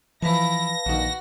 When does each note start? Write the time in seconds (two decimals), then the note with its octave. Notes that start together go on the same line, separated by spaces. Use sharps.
0.22 E3 F3 E4 B4 F5 A5 A#6
0.86 A#1 D#3 F#4